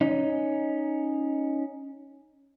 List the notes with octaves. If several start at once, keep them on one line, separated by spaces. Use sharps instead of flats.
C#4 D#4